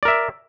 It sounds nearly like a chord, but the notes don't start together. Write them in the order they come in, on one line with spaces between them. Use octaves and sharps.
D5 A#4 E5